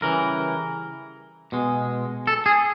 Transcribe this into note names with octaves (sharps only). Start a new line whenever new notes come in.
C#3 E3 G3 A#4
B2 G#3
A4
G#4